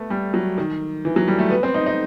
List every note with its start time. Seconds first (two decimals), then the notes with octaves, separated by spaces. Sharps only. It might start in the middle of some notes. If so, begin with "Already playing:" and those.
Already playing: A3 B3
0.10 G3
0.34 F#3
0.58 D#3
1.05 E3
1.16 F#3
1.28 G3
1.39 A3
1.50 B3
1.63 C4
1.74 D#4
1.86 D#4